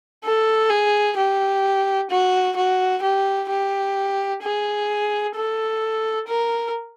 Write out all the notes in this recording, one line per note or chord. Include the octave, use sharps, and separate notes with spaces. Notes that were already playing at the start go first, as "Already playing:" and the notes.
A4
G#4
G4
F#4
F#4
G4
G4
G#4
A4
A#4